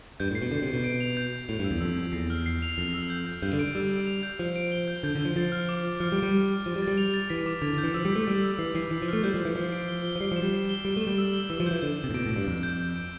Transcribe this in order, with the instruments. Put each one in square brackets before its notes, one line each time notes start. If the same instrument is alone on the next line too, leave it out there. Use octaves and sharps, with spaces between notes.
[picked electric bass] G2 [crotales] G6
[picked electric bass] A2
[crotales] C7
[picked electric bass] B2
[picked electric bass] D3 [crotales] G6
[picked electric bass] C3
[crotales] C7
[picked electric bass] B2
[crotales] D7
F7
G6
G6
[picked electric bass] A2 [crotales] F7
[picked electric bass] G2
[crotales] E6
[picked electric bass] E2
[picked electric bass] F2 [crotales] E6
[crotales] F7
[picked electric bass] E2 [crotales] C7
[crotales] F6
C7
F7
[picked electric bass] F2 [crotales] F7
[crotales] E6
G6
G6
[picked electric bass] G2 [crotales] G6
[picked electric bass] D3
[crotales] D7
[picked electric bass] G3 [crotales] E6
[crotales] D7
F7
G6
[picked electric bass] F3 [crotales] F7
[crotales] D7
G7
G6
[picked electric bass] D3 [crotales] G6
[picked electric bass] D3
[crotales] G7
[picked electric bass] F3
[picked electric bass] F3 [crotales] A6
[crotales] F6
D6
D6
[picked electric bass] F3 [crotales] F6
[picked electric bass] G3
[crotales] D7
[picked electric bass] G3
[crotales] F6
F6
[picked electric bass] F3 [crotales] A6
[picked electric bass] G3
[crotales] A6
[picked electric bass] G3
[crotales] F7
A6
[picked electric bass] E3 [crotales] B6
[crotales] D6
[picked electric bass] D3 [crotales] F7
[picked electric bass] D3
[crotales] G6
[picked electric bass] E3
[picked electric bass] F3 [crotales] E6
[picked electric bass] G3
[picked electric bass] A3 [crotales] B6
[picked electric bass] G3 [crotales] E6
[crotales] E6
[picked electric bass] E3 [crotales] C7
[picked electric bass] E3 [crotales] C7
[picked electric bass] E3 [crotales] C7
[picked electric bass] F3
[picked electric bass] A3 [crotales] F6
[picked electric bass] G3 [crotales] G6
[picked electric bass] F3
[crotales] G6
[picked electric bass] E3
[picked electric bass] F3 [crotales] G7
[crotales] D7
G7
G7
[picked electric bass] F3
[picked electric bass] G3 [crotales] C7
[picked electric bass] F3
[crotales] E7
[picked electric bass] G3
[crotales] E7
G7
[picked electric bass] G3 [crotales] G7
[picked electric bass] A3
[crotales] E7
[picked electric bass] G3
[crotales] E6
G7
[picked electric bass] E3 [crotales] E6
[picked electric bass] F3
[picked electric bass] E3 [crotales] G6
[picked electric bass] D3 [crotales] G6
[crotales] G6
[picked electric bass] C3
A2
[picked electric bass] B2 [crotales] D7
[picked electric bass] A2
[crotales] D7
[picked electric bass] G2
[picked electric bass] F2 [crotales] D7
[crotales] G6
G6
D7